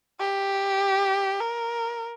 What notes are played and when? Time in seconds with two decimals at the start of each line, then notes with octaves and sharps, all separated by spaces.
0.20 G4
1.40 A#4